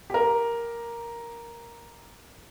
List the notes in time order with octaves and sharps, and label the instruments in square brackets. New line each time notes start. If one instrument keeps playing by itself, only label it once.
[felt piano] G4 A#4